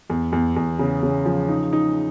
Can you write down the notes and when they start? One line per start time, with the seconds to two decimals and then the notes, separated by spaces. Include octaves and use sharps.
0.10 E2
0.32 E2
0.56 E2
0.79 C#3
1.03 C#3
1.25 F3
1.49 D#4
1.73 D#4